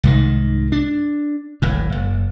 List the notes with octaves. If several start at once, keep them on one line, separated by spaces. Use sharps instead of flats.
C2 G#2 D#3
D4
D1 G#1 A2
F#1